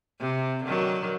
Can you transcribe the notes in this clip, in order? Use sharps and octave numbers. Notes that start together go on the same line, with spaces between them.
C3
D3 D#3 F#3